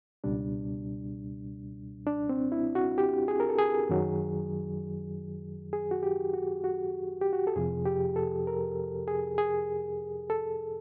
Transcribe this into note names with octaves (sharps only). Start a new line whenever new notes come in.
C#2 B2 G3 D4
D4
C4
E4
F#4
G4
G#4
A#4
A4
G#4
F#2 D#3 F#3
G#4
F#4
G4
F#4
F#4
G4
F#4
A4
F2 C3 F3 G#4
G4
A4
A#4
G#4
G#4
A4